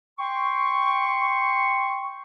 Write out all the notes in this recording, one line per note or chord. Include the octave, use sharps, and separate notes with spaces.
G5 C6 C#6